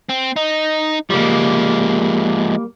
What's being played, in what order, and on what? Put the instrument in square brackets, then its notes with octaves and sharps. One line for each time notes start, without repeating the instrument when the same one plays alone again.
[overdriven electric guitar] C4
D#4
[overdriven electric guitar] F3 G#3 [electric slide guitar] G3 A#3